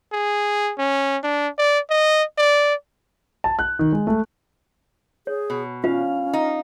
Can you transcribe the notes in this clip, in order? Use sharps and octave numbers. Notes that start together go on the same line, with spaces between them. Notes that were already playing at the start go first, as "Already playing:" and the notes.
G#4
C#4
D4
D5
D#5
D5
A5
F#6
D#3
G#3
A3
G#4 C#5
B2
C#4 F4 F5 B5
D#4